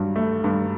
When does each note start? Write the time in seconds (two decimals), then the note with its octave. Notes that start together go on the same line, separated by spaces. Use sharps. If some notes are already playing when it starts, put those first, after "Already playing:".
Already playing: G2 F#3
0.16 A3
0.44 G2